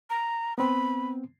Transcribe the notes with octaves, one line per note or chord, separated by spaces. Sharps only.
A#5
B3 C4 B5